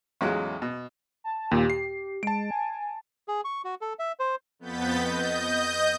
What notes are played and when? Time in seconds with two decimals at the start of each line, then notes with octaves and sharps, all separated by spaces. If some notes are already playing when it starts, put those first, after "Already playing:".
0.21 A1 E2 F#3 G#3 F4 F#6
0.62 B2
1.24 A5
1.51 D#2 A#2 G4
1.70 C7
2.23 G#3 A5 D7
2.51 G#5
3.28 G#4
3.45 C#6
3.64 F#4
3.81 A4
3.99 E5
4.19 C5
4.59 F2 B3 G6 A6 B6
5.01 D#5 G6